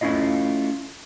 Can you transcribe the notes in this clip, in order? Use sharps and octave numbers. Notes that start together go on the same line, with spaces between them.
A3 C#4 E4 F4 D#5